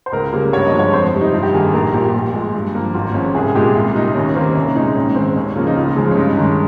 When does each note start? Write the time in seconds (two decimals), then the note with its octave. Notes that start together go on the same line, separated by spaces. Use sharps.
0.06 C5
0.12 C#2 A#4
0.33 C#3 G3 A#3
0.53 G2 C#5
0.66 D#5
0.72 F3 G#3
0.79 C#5
0.93 F2 C5
1.13 C3 G3
1.21 D#4
1.32 G2 F4
1.43 G4
1.53 D#3 G3 A#3 G#4
1.73 A#1 A#4
1.94 A#2 G4
1.98 G3 F4
2.09 G4
2.14 A#1
2.34 A#2 G#3
2.55 G2
2.75 F3 A#3
2.94 G#1 F4
3.14 G#2 F3 C#4
3.35 C2 G#4
3.55 A#2 G#3 G4
3.75 C2 F4
3.95 A#2 G3 D#4
4.15 D#2 C#4
4.36 D#3 A#3 C4
4.55 C2 C#4
4.75 A#2 G#3 D#4
4.95 A#1 C#4
5.16 G#2 D#3 C4
5.36 D#2 C#4
5.56 C#3 F3 A#3 F4
5.67 D#4
5.76 C#2 F4
5.96 C#3 F3 G#3
6.11 C#4
6.17 G2 D#4
6.32 C#4
6.37 D#3 G#3 D#4